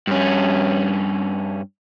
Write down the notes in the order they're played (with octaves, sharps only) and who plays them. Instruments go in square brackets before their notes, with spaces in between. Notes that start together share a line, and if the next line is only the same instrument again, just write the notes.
[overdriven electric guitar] G2 C#4